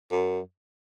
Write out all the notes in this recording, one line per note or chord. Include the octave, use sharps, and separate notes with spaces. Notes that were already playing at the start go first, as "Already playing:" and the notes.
F#2